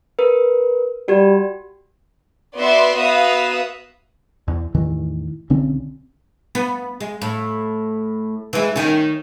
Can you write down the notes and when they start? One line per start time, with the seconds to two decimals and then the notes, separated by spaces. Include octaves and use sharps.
0.19 A#4 B4
1.08 G3 F#4 G4
2.57 B3 F#4 B4 D5 E5 C6
2.97 B3 F#4 B4 E5 F5 D#6
4.48 E2
4.74 E2 A2 D#3 E3
5.50 B1 D3 C4 C#4
6.55 B3
7.00 G#3
7.22 A2
8.53 E3 G#3
8.76 D#3 C#4